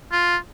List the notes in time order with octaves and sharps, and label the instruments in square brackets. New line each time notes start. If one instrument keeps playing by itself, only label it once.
[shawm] F4